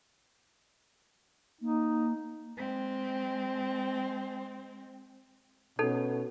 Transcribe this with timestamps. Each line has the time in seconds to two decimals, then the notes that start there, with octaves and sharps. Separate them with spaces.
1.61 A#3 D#4
2.57 G#3 C4
5.79 B2 C#4 D#4 A4